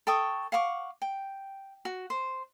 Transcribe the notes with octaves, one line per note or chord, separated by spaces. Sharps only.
A4 G5 C#6 D#6
F5 F#5 C#6 D6
G5
F#4
C5